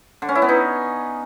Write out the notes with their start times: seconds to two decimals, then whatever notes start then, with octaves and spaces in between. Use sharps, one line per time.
0.22 D3
0.29 C#4
0.35 E4
0.42 B3
0.49 D#4